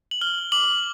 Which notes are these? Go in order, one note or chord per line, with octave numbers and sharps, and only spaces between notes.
F#7
F6 G7
D6 F#7